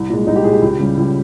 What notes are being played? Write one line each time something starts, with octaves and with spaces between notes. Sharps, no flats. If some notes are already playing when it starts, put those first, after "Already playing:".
Already playing: C2
A#2 G#3
C2 D#4
G4
A#2 G#3 G#4
G4
C#2
C#3 G3
C#2